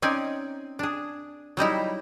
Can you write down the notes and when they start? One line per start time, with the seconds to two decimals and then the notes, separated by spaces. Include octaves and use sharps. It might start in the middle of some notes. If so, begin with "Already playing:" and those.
0.02 C4 C#4 D#4 D5 G#5
0.79 D4 G#4
1.57 F#3 G3 D#4 E4